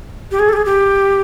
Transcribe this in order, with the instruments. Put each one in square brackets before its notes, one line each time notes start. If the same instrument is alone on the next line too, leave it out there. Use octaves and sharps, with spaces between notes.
[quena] G4
G#4
A4
G4
G#4
G4